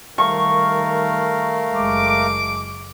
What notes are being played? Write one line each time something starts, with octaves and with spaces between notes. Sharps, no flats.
D#3 G3 A3 A#4 F5 C#6
F#1 G#3 D6